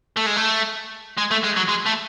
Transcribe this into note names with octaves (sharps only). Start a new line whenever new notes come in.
A3
G#3
A3
G#3
A3
G#3
F#3
G#3
A3